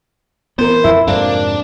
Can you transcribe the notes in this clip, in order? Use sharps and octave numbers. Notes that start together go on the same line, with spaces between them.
E3 B3 C4 A#4 C5
F2 E4
F2 G#2 C3 A#3 D4 C5